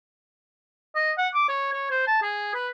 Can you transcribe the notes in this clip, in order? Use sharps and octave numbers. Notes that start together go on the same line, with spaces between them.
D#5
F#5
D6
C#5
C#5
C5
A5
G#4
B4